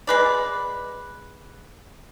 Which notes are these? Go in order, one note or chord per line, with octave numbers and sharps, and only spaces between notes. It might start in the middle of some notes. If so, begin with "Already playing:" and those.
G#3 B4 D5